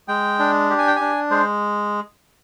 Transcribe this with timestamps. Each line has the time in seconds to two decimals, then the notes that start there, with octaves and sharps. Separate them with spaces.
0.08 G#3 G5
0.39 D4
0.70 G4
0.78 G#5
0.87 G5
0.96 D4 G#5
1.30 G#3 C5